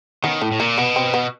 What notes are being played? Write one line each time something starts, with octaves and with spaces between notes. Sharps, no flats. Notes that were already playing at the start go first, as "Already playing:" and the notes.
D#3 B3 C#4
A2 A3
A2
A#2 A#3
B2 B3
C4
B3